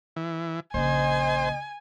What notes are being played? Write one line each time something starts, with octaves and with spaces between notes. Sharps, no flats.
E3
A#1 C#3 C5 D#5 G#5